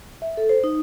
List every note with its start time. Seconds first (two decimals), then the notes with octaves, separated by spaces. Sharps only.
0.22 E5
0.37 A4
0.49 C5
0.64 D#4